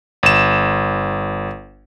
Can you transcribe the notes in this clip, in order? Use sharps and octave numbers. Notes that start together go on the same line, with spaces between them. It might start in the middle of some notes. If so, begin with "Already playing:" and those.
G1 E7